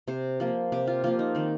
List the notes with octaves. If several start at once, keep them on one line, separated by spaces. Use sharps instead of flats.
C3 C5
F3 A#3
C3 G4
F4
F3 A#3 F4
D#4
D#3 C4